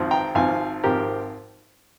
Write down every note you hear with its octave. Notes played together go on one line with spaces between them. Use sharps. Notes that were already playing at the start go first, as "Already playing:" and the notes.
Already playing: G#1 G#2 F3 C4
G5 A#5
G#1 G#2 F3 C4 F5 G#5
G#1 G#2 F3 C4 G4 A#4